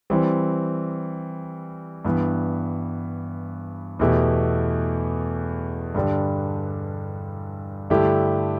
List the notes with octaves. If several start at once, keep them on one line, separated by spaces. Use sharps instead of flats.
E3 G3 C4
G2 E3 B3
E2 B2 A3 E4 G4
G2 D3 G3 D4
G2 D3 A3 E4 G4